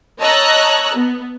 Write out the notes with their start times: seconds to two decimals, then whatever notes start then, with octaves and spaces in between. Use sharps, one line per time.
0.20 C#5 D#5 A5 A#5 E6 F#6
0.94 B3